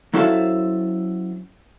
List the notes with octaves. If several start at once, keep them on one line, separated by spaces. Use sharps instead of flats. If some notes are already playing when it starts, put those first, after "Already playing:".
F#3 C#4 E4 A4 C5 F5